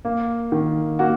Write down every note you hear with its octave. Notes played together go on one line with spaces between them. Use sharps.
A#3
D#3
A#3 F#4